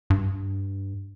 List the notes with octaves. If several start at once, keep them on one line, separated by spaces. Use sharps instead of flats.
G2